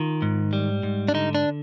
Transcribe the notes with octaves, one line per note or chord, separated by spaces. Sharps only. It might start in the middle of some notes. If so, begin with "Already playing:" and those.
Already playing: D#3 F4
G#2
G3
G#2
D4
D3 D#4
D4